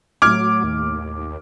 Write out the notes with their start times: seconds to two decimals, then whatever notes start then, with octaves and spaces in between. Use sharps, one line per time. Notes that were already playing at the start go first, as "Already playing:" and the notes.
0.22 A2 F#3 A3 D6 F6 G#6
0.64 D#2